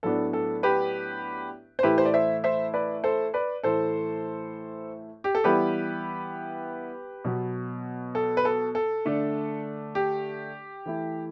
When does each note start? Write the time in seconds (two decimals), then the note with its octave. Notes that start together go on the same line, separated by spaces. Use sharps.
0.03 A2 F#3 B3 D4 A4
0.33 A4
0.63 G4 B4
1.79 C5
1.83 A2 E3 A3 E4 G4 B4
1.98 C5
2.05 D5
2.14 C5 E5
2.44 C5 E5
2.74 B4 D5
3.04 A4 C5
3.34 B4 D5
3.63 A2 E3 A3 E4 A4 C5
5.24 G4
5.35 A4
5.44 E3 G3 B3 E4 G4 B4
7.25 B2 F#3 B3
8.15 A4
8.37 B4
8.45 A4
8.75 A4
9.05 D3 A3 D4
9.95 G4
10.86 E3 A3 E4